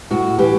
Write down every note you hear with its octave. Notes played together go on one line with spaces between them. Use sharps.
A2 F#4
E3 G4